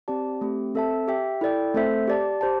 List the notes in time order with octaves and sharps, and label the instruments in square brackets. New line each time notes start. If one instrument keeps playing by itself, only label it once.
[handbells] C4 G4 D5 A5
A3 C4 G4
C4 A4 E5 A5
G4 E5 G5
E4 A4 D5 G5
A3 C4 A4 C5 E5
G4 D5 A5
G4 C5 A5